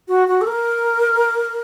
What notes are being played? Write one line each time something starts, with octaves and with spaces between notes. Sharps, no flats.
F#4
F#4
A4
A#4